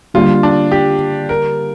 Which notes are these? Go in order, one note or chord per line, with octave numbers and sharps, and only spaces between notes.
D3 G3 A#3 F4
D4
G4
A#4